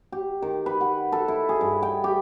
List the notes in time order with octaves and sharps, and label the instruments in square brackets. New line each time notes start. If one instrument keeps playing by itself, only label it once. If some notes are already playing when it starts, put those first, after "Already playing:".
[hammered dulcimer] G4
D#3
B4
F#5
A4
E4
G#4
G2
G5
G4